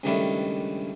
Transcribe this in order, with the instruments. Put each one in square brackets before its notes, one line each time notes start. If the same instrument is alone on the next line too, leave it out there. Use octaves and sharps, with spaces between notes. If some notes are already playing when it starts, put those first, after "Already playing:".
[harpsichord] C#2 G2 D#3 A3 D4 E4